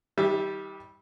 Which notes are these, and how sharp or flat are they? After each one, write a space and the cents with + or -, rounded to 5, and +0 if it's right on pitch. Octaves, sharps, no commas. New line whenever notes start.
D#3 +40 G3 -5 E5 +0